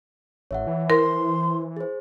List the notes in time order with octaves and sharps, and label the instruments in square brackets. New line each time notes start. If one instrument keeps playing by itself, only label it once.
[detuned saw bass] A1 [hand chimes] C#5 E5 F#5
[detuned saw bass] E3
[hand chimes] E4 C5 [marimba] A#4 [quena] C6
[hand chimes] G#4 C5